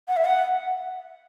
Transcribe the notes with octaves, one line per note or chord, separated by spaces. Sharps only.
F#5
E5
F#5